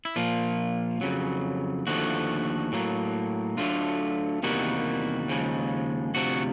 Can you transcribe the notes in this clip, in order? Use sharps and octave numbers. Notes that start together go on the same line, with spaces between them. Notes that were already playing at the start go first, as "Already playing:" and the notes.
E4
A#2 F3 A#3 F4
F2 C#3 F#3
D#2 D3 F3 A3 F#4
A2 F#3 A#3
D2 D3 F#3 A3 F4
E2 C3 D#3 G3 A#3 F#4
D#2 C#3 F3 G#3
D2 C3 F3 F#4